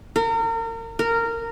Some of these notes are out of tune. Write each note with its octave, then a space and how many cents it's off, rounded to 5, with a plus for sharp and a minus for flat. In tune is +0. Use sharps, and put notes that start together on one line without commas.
A#4 -35
A#4 -15